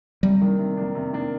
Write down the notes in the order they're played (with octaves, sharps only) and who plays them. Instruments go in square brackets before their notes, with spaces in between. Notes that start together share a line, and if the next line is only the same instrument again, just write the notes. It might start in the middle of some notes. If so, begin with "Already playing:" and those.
[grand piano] C3 [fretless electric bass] G3
[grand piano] D#3 A#3 D4
C3
D#3 A#3 D4
C3
D#3 A#3 D4